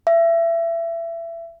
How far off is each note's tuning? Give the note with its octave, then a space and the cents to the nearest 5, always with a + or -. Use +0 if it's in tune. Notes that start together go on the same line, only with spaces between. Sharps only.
E5 +25